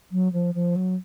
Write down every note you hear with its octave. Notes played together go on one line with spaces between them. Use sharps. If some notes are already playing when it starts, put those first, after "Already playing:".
F#3
F3
F3
F#3